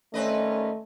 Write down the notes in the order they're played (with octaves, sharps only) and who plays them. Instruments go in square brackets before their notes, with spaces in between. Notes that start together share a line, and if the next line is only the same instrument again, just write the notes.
[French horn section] D#2 C#4 D5 [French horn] A3 [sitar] C4 B4 D#5